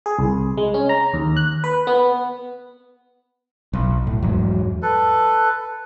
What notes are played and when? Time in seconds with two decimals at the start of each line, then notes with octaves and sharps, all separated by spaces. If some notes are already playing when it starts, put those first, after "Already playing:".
0.06 G#4
0.19 C2
0.57 G#3
0.74 C#4
0.89 A#5
1.14 D#2
1.37 F#6
1.64 B4
1.87 B3
3.73 B1
4.07 A2
4.22 E2 G#2 F#3
4.82 A4 B4